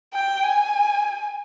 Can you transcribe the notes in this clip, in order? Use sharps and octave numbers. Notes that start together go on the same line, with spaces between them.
G5
G#5